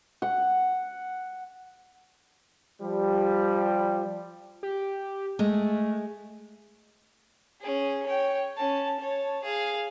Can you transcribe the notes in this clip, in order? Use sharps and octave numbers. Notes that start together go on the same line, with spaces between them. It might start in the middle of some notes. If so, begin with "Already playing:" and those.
F#5
F3 G3
G4
G#3 A3
C#4 G#4
C#5 G5
C#4 A5
C#5 A5
G#4 F5